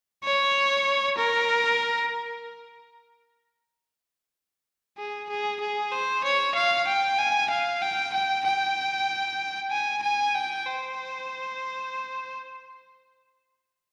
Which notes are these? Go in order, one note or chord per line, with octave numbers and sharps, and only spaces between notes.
C#5
A#4
G#4
G#4
G#4
C5
C#5
F5
G5
G#5
F5
G5
G5
G5
G#5
G#5
G5
C5